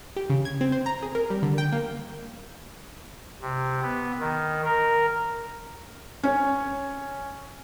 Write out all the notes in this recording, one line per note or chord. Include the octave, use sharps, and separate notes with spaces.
G4
C#3
G#6
C4
C5
A#5
G#4
A#4
G3
D3
G5
A#3
C3
B3
D#3
A#4
C#4 C#5